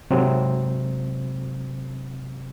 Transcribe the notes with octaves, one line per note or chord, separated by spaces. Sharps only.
G#2 C3 F#3 C4